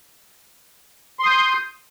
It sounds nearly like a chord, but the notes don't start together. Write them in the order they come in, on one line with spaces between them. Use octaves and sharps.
C6 D#6 G6